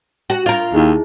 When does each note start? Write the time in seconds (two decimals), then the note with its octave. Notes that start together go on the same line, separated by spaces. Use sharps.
0.30 F#4
0.46 F4 A#4
0.74 D#2 D#4 E4 G#4